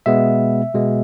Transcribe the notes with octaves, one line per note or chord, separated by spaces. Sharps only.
B2 G#3 B3 E5
B2 G#3 B3